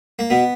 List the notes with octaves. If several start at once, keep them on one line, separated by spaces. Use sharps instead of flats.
A#3
B2 B3